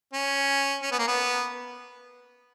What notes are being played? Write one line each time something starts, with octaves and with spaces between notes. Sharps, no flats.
C#4
C#4
B3
A#3
B3